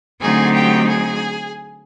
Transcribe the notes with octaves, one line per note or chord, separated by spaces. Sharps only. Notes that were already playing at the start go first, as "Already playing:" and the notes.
D3 F#3 A3 C4 D#4 G#4 G#5
G4 G5
G#4 G#5